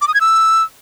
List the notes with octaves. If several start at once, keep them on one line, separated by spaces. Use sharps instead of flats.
D6
D#6
G#6
E6